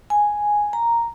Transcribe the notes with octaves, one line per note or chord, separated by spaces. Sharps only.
G#5
A#5